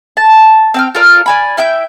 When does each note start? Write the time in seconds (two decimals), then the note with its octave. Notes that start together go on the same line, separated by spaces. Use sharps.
0.17 A5
0.74 C4 G5 F6
0.95 F4 A4 A#4 D5
1.26 D5 G#5 B5
1.57 E4 E5 G5 G6